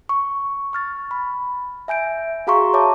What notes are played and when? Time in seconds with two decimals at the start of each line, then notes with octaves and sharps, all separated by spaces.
0.09 C#6
0.73 C#6 F6 A6
1.11 B5
1.88 E5 G#5 G6 D7
2.47 F#4 G#4 F5 A#5 C6 C#6
2.74 C#5 E5 A5 D6